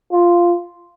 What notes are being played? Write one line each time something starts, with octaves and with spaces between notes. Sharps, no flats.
F4